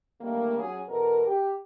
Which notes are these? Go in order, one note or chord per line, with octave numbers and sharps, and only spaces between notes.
D3 D#3 G3 A3 A#3
F#3 C#4 G#4
E2 B2 A4 A#4
G4